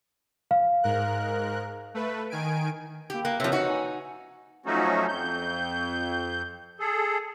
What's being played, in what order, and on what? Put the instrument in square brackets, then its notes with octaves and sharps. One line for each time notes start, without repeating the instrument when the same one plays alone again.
[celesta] F5
[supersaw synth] G#2 A#4 F#6
A3 B4
D#3 G#5 D7
[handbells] A#3 G5 [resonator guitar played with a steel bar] G4
[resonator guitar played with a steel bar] A#3 [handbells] F#6
[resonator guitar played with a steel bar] C3 F3 [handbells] B4 C#5 E6
[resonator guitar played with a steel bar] D#4 F#4
[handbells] G#5
[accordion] F3 F#3 A3 C#4 D#4 F#4
F2 G6
G#4 A4